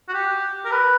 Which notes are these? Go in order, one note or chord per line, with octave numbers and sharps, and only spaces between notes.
F#4
G4
A#4
B4